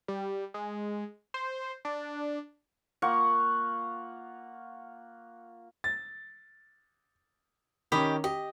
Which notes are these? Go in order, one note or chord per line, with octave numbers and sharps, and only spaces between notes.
G3
G#3
C5
D4
A#3 F4 F#5 C#6
A6
D#3 C#4 G4 D#5 B5
G4 D#5